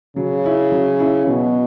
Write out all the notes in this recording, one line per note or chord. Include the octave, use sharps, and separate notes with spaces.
C#3 F#3
C#4 E4
F#3
C#4 E4
B2 F#3